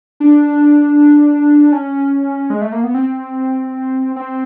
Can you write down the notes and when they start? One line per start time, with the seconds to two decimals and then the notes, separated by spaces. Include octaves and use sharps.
0.20 D4
1.72 C#4
2.50 G#3
2.61 A3
2.72 A#3
2.84 B3
2.94 C4
4.16 C4